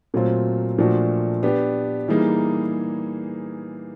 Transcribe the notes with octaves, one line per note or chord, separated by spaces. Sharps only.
A#2 F#3 A3 C4 F4
A#2 F3 A3 D4 F#4
B3 D4 G4
E3 G3 A#3 D#4 G#4